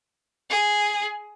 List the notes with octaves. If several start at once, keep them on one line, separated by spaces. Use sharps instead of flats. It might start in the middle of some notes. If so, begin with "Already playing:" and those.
G#4